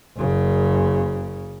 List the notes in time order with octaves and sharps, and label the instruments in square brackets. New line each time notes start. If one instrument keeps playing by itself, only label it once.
[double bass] F#1 C#3